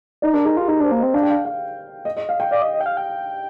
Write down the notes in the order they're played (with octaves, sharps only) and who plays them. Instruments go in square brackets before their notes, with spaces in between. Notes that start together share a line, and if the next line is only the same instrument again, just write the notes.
[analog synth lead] D#4 [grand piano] D5
[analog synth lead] D4 [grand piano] A#4
[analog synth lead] D#4 [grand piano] G#4
[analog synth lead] F4 [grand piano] G4
[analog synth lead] D#4 [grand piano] G#4
[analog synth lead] D4 [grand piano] C5
[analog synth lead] A#3
[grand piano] D#5
[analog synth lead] C4
[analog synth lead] D4 [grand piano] F5
[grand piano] G5
F5
F5
D#5
D#5
F5
G5
[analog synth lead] D5 [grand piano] F5
[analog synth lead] D#5
D#5
G5
F5
G5